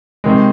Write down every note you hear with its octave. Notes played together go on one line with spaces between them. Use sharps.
C3 D#3 G#3